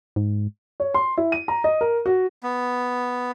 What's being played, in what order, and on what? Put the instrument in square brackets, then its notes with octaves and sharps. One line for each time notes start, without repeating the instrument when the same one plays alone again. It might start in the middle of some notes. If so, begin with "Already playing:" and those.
[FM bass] G#2
[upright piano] C#5
C6
E4
D#7
A#5
D#5
A#4
F#4
[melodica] B3